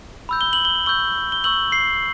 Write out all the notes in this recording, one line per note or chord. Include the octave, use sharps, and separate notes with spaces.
B5 E6 G6
G7
F#7
G7
C#6 E6 G6 G7
G7
C#6 E6 G6 F#7
C7